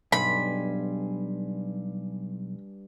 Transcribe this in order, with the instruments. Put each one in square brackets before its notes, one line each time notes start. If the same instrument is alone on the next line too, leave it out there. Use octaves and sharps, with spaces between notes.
[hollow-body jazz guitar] B1 [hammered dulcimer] G2 G#5 C6 [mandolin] B5